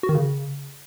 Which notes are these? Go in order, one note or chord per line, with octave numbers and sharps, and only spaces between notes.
F#4
D#3
C#3